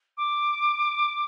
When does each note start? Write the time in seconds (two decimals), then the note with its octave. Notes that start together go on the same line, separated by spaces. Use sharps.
0.17 D6